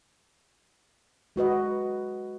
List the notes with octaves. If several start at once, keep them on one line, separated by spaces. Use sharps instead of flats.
G#3 F#4 B4 D#5